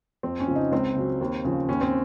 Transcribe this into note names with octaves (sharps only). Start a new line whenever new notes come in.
F2 C4
C#4
C#3 F3
D#4
C#2 C4
C#3 F#3
D#2
C#3 F3
D#2 C#4
C4